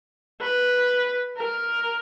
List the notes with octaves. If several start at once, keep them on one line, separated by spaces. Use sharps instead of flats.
B4
A#4